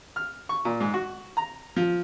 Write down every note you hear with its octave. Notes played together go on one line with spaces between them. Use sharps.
F6
C#6
A#2
G#2
F#4
A#5
F3